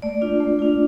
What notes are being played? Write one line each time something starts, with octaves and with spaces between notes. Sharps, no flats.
A3 D5
D4 F4
A3
D4 F4